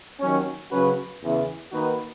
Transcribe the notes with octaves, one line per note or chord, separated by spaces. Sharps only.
D#2 D#3 F#3 C#4
C#3 F#3 C#4 F#4 B4
E2 C#3 E3
D#3 A#3 D#4 F#4 B4